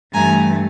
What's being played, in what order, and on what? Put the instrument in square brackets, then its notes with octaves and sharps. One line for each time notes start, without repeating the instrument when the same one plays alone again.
[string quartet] G2 E3 A3 G#5 A#5